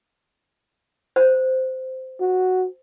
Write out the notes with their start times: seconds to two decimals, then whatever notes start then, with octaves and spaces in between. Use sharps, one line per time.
1.16 C5
2.20 F#4